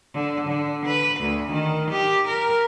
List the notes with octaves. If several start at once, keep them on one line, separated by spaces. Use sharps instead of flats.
D3
D3
B4
D2
D#3
G4
A#4